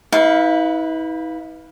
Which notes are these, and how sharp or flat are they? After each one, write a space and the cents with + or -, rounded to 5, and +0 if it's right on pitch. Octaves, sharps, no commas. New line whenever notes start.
E4 -45 B4 +0 F5 +0